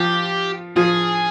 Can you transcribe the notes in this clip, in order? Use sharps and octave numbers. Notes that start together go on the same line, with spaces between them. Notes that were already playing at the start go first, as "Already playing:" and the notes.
Already playing: F3 F4 G4
F3 F4 G#4